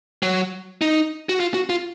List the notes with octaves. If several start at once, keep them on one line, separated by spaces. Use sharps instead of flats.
F#3
D#4
F#4
F4
F#4
F4